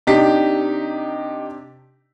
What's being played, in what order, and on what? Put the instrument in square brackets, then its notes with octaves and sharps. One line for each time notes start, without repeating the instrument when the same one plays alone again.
[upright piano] C3 D4 B6 [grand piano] D#4 G4